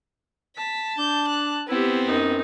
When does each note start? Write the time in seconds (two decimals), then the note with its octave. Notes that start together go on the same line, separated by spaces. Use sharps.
0.57 A5 B6
0.98 D4 G6
1.28 F#6
1.69 B3 C4 E4 G4
2.07 F#2 D#4